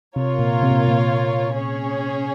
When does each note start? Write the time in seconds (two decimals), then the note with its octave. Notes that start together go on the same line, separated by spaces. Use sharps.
0.16 C3 F4 A#4 C#5
0.39 A#2
0.63 C3
0.71 A#2
0.88 A#2
1.55 C#4 G#4 C#5